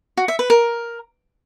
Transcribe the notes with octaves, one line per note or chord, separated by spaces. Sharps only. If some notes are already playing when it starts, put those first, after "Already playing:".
F#4
E5
B4
A#4